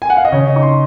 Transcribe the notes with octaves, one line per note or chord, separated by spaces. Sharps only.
G#5
F#5
F5
D#5
C#3 C#5
D#5
D#4 C#6
C6